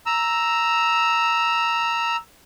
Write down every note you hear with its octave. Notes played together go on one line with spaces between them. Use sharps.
A#5 E6